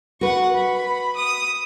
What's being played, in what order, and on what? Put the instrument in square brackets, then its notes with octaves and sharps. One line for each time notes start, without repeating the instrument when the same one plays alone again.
[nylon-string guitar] F#4 B4 [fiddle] F#5 C#6
[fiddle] B5
D#6